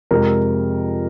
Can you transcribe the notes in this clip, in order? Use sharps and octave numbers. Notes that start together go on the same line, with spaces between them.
F2 C3 F3 G#3 A#4